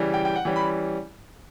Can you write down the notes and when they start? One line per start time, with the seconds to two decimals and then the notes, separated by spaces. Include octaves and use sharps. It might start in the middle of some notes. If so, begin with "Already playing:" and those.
Already playing: C#3 E3 G3
0.14 G5
0.25 G5
0.36 F#5
0.45 E3 G3 C#4 G5
0.56 B5